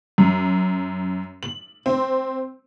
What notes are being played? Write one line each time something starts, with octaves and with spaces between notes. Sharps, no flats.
F#2
F#7
C4